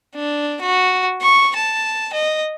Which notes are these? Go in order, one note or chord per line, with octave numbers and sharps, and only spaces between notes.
D4
F#4
C#6
A5
D#5